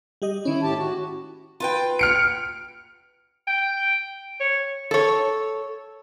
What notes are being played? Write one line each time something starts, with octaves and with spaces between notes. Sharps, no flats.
G3 G4 D#5
D#3 C#4 E4
A2 G4 A5
F#4
F4 B4 G5
F6 C#7 D7
G5
C#5
A4 C#5